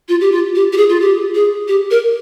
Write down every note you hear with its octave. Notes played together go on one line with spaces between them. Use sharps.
F4
G4
F4
G4
G4
G#4
F4
G4
G#4
G4
A#4